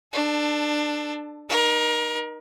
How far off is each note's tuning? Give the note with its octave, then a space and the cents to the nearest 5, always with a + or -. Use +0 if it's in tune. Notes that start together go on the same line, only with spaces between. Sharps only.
D4 +20 A4 +0
D#4 -20 A#4 +30